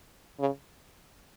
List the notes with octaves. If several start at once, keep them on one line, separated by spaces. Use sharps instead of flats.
C#3